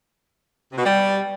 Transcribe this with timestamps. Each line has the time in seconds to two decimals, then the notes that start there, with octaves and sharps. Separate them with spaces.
0.71 C3
0.78 B2
0.84 G3